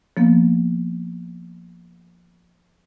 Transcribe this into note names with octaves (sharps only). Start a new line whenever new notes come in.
F3 A#3 B3